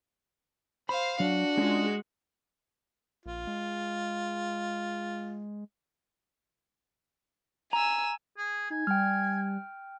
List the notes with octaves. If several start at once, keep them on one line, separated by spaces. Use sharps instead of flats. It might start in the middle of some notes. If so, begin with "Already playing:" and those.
C5 F5 B5
F#3 D4 F#4
G#3 C#4 F4
A#1 F4
G#3
G#5 A#5 E6
G#4
D#4 G#5
G3 G5 F6